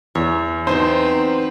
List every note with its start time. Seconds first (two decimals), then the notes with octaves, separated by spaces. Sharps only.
0.15 E2 C#5
0.67 F#3 B3 C4 D#4 B4 C5